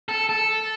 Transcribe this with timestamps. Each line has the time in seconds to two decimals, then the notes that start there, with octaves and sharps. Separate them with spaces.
0.09 A4
0.29 A4